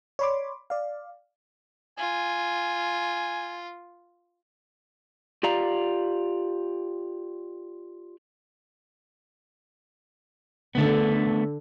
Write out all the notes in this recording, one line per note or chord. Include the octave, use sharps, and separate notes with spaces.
C#5 D5 B5 C6 D6
D5 F5
F4 G#5
F4 G4 D5 F5 A#5
D3 A3 B3